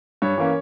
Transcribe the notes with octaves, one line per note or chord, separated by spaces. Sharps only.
G2 C#5
E3 A#3 C#4